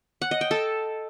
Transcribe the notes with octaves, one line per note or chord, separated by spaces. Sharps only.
F#5
D#5
G5
A4